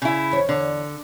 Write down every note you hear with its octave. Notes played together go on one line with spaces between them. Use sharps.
C#3 E4
E2 C#5
D3